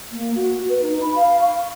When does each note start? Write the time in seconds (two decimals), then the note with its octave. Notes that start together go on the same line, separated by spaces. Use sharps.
0.12 A#3
0.35 F#4
0.69 B4
0.81 D#4
1.01 B5
1.15 F5
1.41 C#6